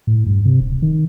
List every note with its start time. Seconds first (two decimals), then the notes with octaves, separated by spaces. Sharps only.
0.07 A2
0.26 G2
0.45 C3
0.60 D1
0.82 D#3